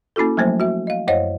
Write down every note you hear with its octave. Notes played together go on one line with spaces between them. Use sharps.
A#3 C#4 E4 F#4 A4
F3 F#3 A3 A#3 C5
F#4 E5
D#5 F5
F#2 C5 C#5 D#5 F5